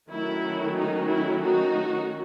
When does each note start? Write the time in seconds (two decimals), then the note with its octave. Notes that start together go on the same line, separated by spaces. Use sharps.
0.11 D#3 F#3 A3 C#4 E4
0.76 D#4
1.07 E4
1.41 D#4 F#4